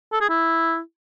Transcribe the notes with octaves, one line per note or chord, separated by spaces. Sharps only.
A4
G#4
E4